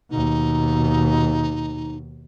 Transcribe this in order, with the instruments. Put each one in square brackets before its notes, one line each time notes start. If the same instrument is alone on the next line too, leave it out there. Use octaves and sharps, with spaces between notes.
[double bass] D#2 B2 [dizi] D#4